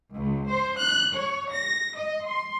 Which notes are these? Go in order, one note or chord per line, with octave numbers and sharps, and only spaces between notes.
C#2
C5
F#6
C#5
A#6
D#5
C6